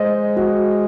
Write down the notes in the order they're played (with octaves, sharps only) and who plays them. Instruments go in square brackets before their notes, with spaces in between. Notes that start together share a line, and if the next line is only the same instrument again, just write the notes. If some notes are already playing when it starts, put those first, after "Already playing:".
Already playing: [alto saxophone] G#3 [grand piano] C5 D#5
[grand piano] F#4